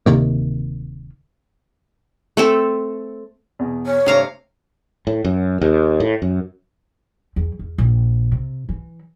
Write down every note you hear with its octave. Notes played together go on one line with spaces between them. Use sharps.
D1 C3 D#3 A#3
A3 C4 A4
E2 B2
C#5
G2 C3 A3 F5 A#5
A2
F#2
D#2
A2
F#2
E2
E2
A#1
C3
E3